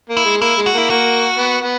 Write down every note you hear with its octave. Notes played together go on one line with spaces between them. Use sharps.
A#3
E4
G#3
A#3 E4
G#3
F#4
A#3 E4
A#3 F#4
B3
B3